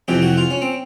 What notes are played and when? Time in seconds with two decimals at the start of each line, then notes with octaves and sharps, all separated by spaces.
0.08 F2 C3 E3 G4
0.22 F#4
0.37 F4
0.51 C#4
0.62 C4